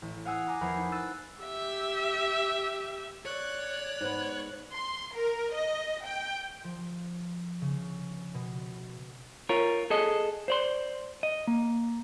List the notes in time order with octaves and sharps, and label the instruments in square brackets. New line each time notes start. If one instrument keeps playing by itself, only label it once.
[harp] A1
F5 F#5 G#5 D#6 E6 F#6
G#5 A#5 D6
E2 F3 A#4 F#5 B5 C7
D#4
E6 F#6 A6 D#7 E7
[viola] G4 E5
[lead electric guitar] C#5 [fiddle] D5 F#6
[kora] G#2 B3
[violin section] C6
A#4
D#5
G5
[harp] F3
C#3
B2
[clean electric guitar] F4 A#4 C#5
G#4 A4 D#5
C5 D5 C6
D#5
A#3